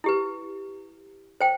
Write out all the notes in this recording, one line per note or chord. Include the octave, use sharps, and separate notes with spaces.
E4 G4 B4
C5 G5